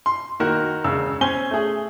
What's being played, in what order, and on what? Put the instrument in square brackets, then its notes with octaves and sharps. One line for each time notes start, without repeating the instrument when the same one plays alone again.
[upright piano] C6
D#3 A#3 F#4 A#4
E1 C#3 E6
C#4 C5 G#5 G7
A3 G#4